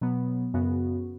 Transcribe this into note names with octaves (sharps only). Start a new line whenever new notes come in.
B2 F#3 B3
F#2 C#3 B3 F#4